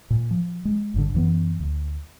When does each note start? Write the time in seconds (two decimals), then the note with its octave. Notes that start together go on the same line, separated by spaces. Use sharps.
0.10 A#2
0.31 F3
0.65 G#3
0.94 G1 G2 D3
1.14 F#2 E3 B3
1.60 D2